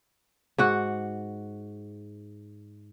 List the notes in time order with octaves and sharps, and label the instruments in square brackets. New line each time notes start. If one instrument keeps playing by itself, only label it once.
[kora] G#2 F#4 F#5